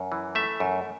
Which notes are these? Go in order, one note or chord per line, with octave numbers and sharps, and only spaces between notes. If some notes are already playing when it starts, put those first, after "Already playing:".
Already playing: F#2
E3
A3 E5
F#2